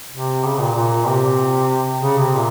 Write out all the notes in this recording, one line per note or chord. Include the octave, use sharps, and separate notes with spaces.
C3
C#3
A#2
A#2
C3
C#3
C3
A#2